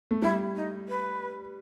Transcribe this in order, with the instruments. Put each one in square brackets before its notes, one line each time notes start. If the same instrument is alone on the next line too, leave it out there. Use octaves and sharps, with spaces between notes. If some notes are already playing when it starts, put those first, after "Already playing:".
[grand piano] A3
[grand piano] G3 [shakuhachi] E4
[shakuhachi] D#4
B4